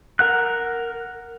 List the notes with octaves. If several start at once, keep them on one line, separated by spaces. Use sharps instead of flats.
A#4 F#5 F#6